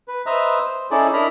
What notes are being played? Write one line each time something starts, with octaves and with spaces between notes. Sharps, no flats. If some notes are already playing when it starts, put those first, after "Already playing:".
B4
B4 C5 D#5 E5 A#5
C5
C#4 D#4 E4 G#4 A4 D5
D4 E4 A#4 D#5 A#5 B5